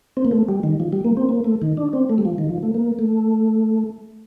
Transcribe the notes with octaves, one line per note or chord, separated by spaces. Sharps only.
C4
A#3
A3
G3
D#3
F3
G3
A#3
C4
A#3
A3
D#3
D4
C4
A3
G3
F3
D#3
F3
A3
A#3
A3